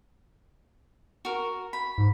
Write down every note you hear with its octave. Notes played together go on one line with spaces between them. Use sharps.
F#4 A#4
B5
G#2